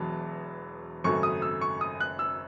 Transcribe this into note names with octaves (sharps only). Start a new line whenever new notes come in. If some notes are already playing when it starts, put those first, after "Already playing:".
Already playing: E1 E2 F#3 A5
G#1 F#2 C#3 F#3 A3 C#6
D#6
E6
C#6
D#6
F#6
E6